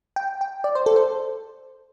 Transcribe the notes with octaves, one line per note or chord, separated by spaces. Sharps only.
G5
G5
D5
C5
A4
C5